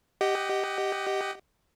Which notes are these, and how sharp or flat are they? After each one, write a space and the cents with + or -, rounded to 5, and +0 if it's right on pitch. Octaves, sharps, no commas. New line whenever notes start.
G4 +0 D#5 +0 F#5 +25